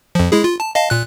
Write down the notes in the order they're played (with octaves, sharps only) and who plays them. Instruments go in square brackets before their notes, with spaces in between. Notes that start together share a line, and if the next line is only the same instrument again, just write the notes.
[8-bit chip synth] F2 F3
G#3 E4 G#4
F4
A5
D#5 F5 A5
A#2 F#6